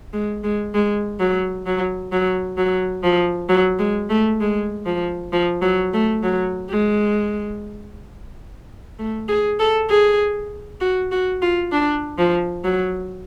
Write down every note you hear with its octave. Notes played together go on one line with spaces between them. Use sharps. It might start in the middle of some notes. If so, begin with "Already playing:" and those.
G#3
G#3
G#3
F#3
F#3
F#3
F#3
F3
F#3
G#3
A3
G#3
F3
F3
F#3
A3
F#3
G#3
A3
G#4
A4
G#4
F#4
F#4
F4
D4
F3
F#3